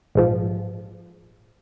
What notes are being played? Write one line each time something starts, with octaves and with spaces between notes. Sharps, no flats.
A#1 G#2 F3